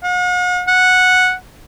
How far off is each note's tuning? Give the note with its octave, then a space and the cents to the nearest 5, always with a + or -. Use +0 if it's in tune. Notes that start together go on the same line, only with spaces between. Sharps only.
F#5 -45
F#5 -10